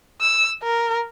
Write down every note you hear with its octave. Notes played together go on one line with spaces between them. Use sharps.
E6
A#4